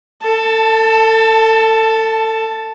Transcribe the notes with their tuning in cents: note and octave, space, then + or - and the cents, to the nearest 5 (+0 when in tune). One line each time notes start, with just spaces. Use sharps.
A4 +30 A5 +0